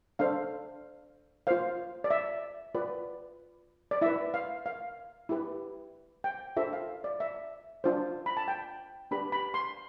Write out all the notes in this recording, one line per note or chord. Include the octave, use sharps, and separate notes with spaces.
D4 A4 C5 F5
F4 C5 F5
D5
E5
F4 B4 D5
D5
E4 B4 E5
F5
F5
E4 G4 B4
G5
D4 F4 A4 C5 E5
F5
D5
E5
D4 F4 C5
B5
A5
G5
D4 G4 B4 B5
B5
C6